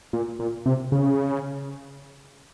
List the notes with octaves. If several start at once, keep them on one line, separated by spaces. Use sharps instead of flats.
A#2
A#2
C3
C#3